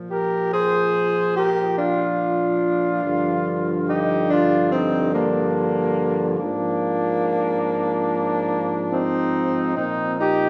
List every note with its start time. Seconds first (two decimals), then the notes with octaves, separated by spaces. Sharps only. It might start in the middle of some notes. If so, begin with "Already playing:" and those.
Already playing: A#2 F3
0.09 G4 A#4
0.51 G#4 C5
1.36 G4 A#4
1.77 D4 F4
3.03 G2 D3 F3
3.87 D#4 G4
4.29 D4 F4
4.71 C4 D#4
5.13 A#3 D4
6.39 G#2 F3 A#3 D4
8.90 C4 D#4
9.75 A#2 F3 C4 D#4
10.17 D#4 G4